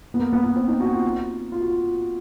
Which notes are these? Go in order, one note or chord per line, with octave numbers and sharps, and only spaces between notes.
B3
A#3
B3
B3
C4
D#4
F#4
F4
F4
F#4
F4